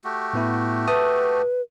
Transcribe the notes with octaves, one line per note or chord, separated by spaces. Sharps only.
A3 F#4 G4
A2 B3 E4
B4 E5 A5 D#6